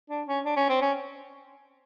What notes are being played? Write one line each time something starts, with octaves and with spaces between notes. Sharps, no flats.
D4
C#4
D4
C#4
C4
C#4